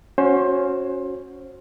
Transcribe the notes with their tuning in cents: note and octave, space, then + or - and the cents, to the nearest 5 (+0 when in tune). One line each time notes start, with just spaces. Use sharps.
C#4 +0 F#4 -10 C5 +20